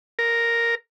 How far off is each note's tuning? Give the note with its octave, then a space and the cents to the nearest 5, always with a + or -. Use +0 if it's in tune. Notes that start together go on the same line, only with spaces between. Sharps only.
A#4 +0